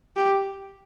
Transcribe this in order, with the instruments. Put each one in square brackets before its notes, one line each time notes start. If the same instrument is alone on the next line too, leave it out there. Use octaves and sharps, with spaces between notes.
[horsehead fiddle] G4